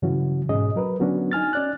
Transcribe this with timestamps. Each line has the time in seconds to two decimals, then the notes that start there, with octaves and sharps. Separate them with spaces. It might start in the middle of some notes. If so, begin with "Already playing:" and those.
0.02 G2 C#3 E3 F#3 C#4 F#4
0.49 G#2 B2 C#4 G#4 D#5
0.76 F#3 A#4 B4
1.00 D3 F#3 B3 C#4 D4 F#4
1.32 D#4 G#5 F6 A6
1.53 C#4 D5 F#6